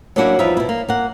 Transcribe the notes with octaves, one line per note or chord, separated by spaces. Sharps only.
F#3 A#3 C#4 D4 E4 F#4
E2 F3 G3 D#4 E4 E5
B2 E4
A#3
A#3 F#5